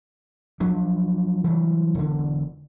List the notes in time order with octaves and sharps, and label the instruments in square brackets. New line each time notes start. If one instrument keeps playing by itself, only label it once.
[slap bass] F3 F#3 D4
E3 F#3 G3
E1 D3